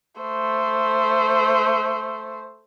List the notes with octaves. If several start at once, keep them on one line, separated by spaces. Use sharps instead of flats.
A3 C5